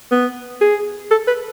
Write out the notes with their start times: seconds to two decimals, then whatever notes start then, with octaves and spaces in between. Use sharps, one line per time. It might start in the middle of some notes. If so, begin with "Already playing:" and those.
0.11 B3
0.61 G#4
1.11 A4
1.27 B4